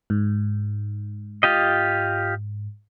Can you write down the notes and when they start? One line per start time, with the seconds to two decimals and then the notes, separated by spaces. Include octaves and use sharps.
0.10 G#2
1.43 F4 G4 D#5